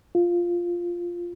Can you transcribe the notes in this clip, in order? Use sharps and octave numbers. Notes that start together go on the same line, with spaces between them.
F4